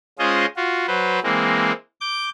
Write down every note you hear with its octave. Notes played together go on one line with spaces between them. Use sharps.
G#3 C#4 F4 G#4 C5 D#5
F4 F#4
F#3 B4 C5
E3 G#3 A#3 C4
D6 G6